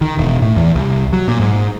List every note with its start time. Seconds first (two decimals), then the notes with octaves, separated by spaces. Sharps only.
0.01 D#3
0.18 E1
0.42 A2
0.56 E2
0.76 C2
1.13 F#3
1.28 A#2
1.40 G#2